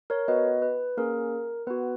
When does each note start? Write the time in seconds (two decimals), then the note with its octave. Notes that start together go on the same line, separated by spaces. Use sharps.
0.10 A#4 C#5
0.28 B3 F#4 B4 D#5
0.62 B4
0.97 A#3 C#4 G#4 A#4
1.67 B3 F#4 B4